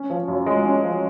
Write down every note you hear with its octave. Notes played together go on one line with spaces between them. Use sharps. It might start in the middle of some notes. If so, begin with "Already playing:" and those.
Already playing: C#4
F3
F#2
G#3
C#4
F3